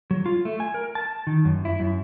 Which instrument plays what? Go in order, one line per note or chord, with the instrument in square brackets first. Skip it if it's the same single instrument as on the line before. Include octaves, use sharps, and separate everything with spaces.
[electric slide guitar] F#3
F4
A3
G#5
A#4
A5
D#3
F#2
E4
F#2